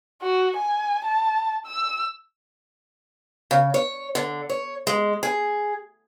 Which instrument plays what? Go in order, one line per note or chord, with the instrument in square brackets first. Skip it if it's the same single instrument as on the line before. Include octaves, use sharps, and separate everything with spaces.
[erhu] F#4
G#5
A5
E6
[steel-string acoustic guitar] C#3
C#5
D3
C#5
G#3
G#4